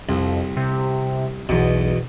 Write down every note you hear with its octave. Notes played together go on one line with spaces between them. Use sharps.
C2 F2
C3
B1 E2 B2